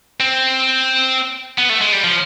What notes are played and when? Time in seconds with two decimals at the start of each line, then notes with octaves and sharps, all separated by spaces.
0.20 C4
1.58 B3
1.69 A3
1.81 G#3
1.92 G3
2.04 F3